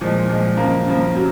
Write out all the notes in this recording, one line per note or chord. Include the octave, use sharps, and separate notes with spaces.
A#2 F3 G#3
A#2 F3 G#3
F#2 C#3 F3 A#3
F#2 C#3 F3 A#3
C3 F#3